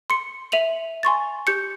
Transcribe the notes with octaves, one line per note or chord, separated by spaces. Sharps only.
C6 C#7
E5 D#7 F7 F#7
G#5 C6 C#6 A6
G4 G6 C#7